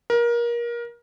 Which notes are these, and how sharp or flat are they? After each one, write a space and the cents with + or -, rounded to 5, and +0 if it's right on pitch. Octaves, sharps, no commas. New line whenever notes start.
A#4 +25